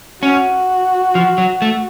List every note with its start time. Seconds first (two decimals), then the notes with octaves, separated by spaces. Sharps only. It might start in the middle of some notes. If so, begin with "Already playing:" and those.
0.23 C#4 F#4
1.15 F3
1.38 F#3
1.62 A3